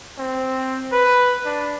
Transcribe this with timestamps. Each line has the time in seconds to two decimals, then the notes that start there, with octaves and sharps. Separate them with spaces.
0.18 C4
0.92 B4
1.46 D4